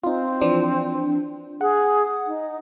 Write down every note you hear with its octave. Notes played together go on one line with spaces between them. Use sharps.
C4 D#4 F4
E3 F3 D4
G#4 F#5
D#4